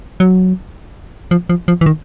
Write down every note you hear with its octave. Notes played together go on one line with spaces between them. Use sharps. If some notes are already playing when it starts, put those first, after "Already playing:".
F#3
F3
F3
F3
E3
D#3